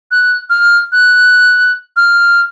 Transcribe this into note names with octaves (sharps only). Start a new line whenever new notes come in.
F#6
F6
F#6
F6